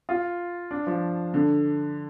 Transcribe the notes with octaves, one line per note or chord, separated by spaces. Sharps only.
F4
D4
F3
D3